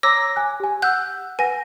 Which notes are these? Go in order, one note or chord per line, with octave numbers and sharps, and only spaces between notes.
C#5 A#5 D6 E6 A#6
G#5 F#6
G4 G#5
F#5 E6 F#6 G6
B4 F#5 G#5 A#6